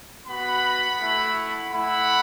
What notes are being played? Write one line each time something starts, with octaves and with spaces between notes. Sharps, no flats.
B3 F#4 F#5 B5
A3 E4
A3 E4 F#5 B5